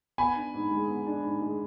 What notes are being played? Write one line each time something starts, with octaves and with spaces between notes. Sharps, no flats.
B3 G#5 B5
D4
G#2
G#3
B3
D4
G#2
G#3